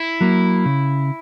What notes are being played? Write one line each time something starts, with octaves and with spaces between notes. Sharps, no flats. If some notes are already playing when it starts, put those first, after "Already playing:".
Already playing: E4
F#3 A#3
C#3